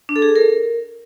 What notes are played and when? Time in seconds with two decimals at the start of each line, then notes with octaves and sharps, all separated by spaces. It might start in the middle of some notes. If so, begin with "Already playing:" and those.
0.09 D4
0.16 A4
0.22 G#4
0.29 A4
0.36 A#4